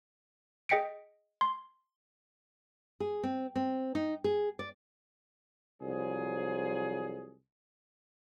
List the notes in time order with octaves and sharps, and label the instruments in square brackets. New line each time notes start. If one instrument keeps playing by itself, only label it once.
[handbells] G#4 D#5 G5 B6 C#7 D7
C6
[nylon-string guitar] G#4
C4
C4
D#4
G#4
D5
[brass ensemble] C2 F3 F#3 G#4